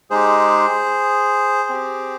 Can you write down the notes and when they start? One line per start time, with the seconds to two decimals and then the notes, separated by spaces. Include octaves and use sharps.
0.10 G#3 D#4 G4 G#4 C5
1.69 C4 G4